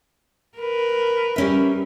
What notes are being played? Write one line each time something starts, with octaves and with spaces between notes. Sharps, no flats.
A#4 B4
G3 C#4 E5